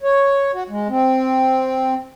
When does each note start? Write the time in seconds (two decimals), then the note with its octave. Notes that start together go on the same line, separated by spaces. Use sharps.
0.03 C#5
0.54 F#4
0.69 G#3
0.89 C4